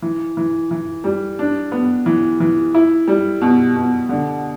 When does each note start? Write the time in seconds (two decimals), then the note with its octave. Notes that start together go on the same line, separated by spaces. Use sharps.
0.02 E3
0.37 E3
0.71 E3
1.04 G3
1.39 D4
1.72 B3
2.06 E3
2.40 E3
2.74 E4
3.08 G3
3.41 B2
3.76 B2
4.09 D3